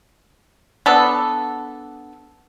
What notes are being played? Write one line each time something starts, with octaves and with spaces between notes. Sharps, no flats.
B3 D4 A4